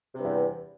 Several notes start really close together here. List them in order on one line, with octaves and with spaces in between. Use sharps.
C3 G2 E2